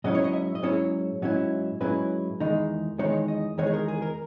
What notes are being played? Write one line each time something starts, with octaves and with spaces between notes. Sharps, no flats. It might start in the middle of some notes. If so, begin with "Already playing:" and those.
G#2 F#3 C#4 E4 D#5
C#5
D#5
E5
D#5
G#2 F#3 C#4 E4 C#5
G#2 F#3 C#4 E4
G#2 F#3 C#4 E4 B4
E2 D#3 G#3 D#4
E2 D#3 G#3 D#4 C#5
D#5
E2 D#3 G#3 D#4 C#5
G#4
A#4
G#4
A#4